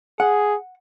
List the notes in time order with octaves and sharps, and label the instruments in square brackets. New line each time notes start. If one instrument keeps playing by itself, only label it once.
[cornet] G#4 [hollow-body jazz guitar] F#5